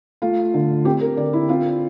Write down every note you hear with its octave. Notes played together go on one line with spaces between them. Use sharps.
A3 F4
D3
C4 G4
A#4
D3 D5
E4
C4 F4